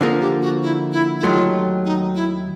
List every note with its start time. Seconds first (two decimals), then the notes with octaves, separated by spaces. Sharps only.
0.01 D3 F3 A#3 G#4
0.21 G4
0.42 F#4
0.62 E4
0.92 E4
1.19 E4
1.23 D#2 D#3 F#3 A3 F4
1.85 D#4
2.15 E4